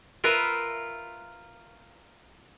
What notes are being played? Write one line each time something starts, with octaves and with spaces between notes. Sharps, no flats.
F4 A#4 B4 E5